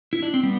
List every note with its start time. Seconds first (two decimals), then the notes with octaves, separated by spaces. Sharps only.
0.13 E4
0.22 D4
0.34 C4
0.43 G3 B3